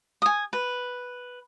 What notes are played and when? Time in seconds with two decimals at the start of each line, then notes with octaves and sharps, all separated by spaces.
0.22 G#5 D#6
0.53 B4